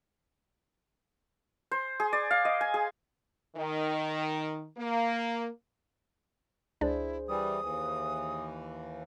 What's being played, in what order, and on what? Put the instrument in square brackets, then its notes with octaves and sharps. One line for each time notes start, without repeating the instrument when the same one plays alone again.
[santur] C5
G#4
D5
F5
D#5
G#5
G#4
[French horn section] D#3
A#3
[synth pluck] C#2 D4 D5 [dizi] E4 [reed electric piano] G#4 C5
[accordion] E3 G3 [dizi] D#6
[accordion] D#2 E3